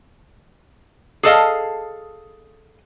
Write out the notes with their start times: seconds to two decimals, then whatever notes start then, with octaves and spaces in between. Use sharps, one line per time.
1.23 G#4 A4 D#5 F5